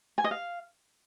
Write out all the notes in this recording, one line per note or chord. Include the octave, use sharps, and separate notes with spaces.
G#5
D#5
F5